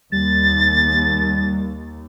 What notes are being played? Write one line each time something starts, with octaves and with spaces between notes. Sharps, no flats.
D#2 G3 A6